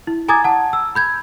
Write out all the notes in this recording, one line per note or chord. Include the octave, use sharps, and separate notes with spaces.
E4
G#5 A#5 D6 D#6 G#6 A6
F#5 A5
E6
B5 G6 G#6